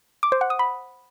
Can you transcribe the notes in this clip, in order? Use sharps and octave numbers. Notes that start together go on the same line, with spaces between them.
D6
C5
F#5
D#6
B5